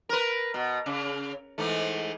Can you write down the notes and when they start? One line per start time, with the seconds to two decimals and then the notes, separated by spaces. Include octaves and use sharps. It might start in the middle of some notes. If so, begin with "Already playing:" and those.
0.09 A#4 B4
0.54 B2
0.86 C#3
1.58 G#2 E3 A3